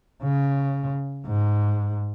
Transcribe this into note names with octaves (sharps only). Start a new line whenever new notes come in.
C#3
G#2